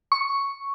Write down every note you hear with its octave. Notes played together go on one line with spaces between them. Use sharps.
C#6